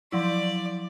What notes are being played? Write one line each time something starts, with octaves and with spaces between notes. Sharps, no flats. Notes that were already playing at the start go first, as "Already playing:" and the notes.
F3 F#3 E4 D5